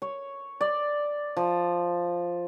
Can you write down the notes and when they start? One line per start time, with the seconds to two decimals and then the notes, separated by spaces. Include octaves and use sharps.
0.02 C#5
0.61 D5
1.37 F3